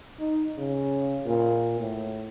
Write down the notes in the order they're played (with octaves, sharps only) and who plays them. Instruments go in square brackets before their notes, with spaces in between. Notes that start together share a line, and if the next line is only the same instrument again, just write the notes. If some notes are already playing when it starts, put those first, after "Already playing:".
[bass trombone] D#4
C#3
A#2
A2